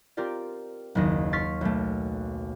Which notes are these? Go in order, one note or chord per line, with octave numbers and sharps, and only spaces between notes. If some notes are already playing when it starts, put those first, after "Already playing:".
C4 F4 G4 A#4 D5
F#1 D#2 A#6
C6 C#6 F6 A6 B6
B1 A3